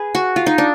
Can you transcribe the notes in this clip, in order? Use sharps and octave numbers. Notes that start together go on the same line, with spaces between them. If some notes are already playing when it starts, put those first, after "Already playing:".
Already playing: G#4 B4
F#4
F4
D#4
D4